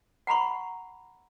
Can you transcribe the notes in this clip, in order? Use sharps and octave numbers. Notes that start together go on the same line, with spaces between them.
F#5 A#5 B5 C#6